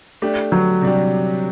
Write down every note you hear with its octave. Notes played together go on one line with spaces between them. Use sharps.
A3 D4 G4
F#3
C3 G3 D4 G4